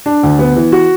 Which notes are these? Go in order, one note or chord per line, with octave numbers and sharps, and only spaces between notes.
D4
D2
B3
E3
F#4